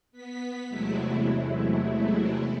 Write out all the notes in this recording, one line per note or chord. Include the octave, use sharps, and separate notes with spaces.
B3 B6
E2 C3 F#3 G#3 A3 E4